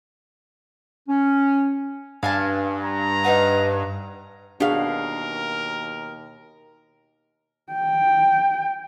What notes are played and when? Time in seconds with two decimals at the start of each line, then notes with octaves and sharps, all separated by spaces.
1.09 C#4
2.23 G2 F5 G#5 A5
2.84 A#5
3.24 D#4 B4 F5 F#5
4.60 D#2 B2 D4 F#4 G#4 A#4 F5
7.73 G5